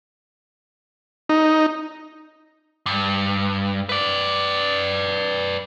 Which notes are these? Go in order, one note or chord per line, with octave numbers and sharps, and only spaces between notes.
D#4
G2
B4 D5